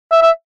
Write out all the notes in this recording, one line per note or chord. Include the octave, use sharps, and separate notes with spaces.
E5
E5